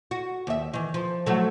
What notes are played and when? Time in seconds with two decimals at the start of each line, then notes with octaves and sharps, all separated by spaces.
0.11 F#4
0.47 D#2 E5
0.74 D#3 E3
0.94 F3
1.26 F3 F#3 A3